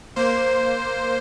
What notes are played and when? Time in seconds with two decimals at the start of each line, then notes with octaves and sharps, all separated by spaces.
0.16 A#3 C5
0.36 A#3